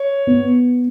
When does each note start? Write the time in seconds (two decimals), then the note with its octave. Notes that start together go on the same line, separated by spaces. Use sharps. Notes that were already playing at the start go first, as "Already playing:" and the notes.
Already playing: C#5
0.27 B3